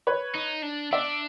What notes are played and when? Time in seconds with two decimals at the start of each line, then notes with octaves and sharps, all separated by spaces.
0.07 B4 C#5
0.35 D#4
0.63 D4
0.92 D4 D5 E5